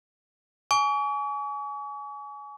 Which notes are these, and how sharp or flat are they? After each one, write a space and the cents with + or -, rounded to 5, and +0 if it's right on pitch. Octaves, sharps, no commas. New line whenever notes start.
G#5 +15 C#6 +45